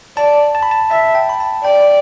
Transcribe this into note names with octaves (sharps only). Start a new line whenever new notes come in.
D5 A5
A5
B5
A5
E5 A5
G5
B5
A5
D5 G5